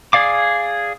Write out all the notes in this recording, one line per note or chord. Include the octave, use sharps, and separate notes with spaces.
G#4 D5 F5 D6